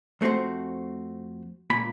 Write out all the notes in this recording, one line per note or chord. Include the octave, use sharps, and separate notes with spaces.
F2 A3 C4 F#4 C5
C#2 A#2 B5